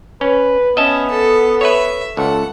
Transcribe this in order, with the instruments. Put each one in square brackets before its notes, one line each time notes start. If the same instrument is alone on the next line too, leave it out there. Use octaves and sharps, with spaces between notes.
[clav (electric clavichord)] C#4 [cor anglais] B4
[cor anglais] B3 [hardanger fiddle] C#4 [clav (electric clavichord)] D#5 E5 A5
[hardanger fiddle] A4
[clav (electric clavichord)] B4 C#5 [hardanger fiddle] E5
[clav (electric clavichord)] C#2 [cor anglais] A4 [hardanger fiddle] F#5